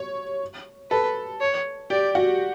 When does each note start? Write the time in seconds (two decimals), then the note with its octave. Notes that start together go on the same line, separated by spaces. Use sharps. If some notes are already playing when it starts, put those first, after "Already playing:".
Already playing: C#5
0.91 A4 B4
1.41 C#5
1.90 G4 D5
2.15 F#4